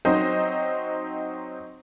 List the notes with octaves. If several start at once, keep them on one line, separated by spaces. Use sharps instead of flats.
F#3 C4 D#4 C5 D#5